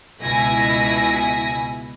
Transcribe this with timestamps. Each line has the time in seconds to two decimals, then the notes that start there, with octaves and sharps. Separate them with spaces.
0.21 C#2 B2 E4 G#5 A#6 B6